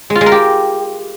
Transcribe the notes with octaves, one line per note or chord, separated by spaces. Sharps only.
G#3
F4
G#3
A#4
G4